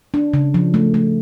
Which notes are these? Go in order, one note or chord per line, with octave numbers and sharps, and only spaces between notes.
D4
C#3
F3
A3
A3